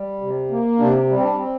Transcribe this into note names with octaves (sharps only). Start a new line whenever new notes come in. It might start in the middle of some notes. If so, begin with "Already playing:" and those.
Already playing: G3
C3
A#3
C3 D4
G3
C4
D4
C4